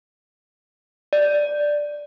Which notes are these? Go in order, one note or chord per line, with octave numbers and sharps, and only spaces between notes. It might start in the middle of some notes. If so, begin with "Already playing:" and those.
D5